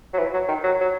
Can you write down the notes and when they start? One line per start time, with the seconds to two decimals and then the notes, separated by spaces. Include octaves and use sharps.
0.13 F#3
0.18 E3
0.33 F#3
0.48 D#3
0.63 F#3
0.81 F#3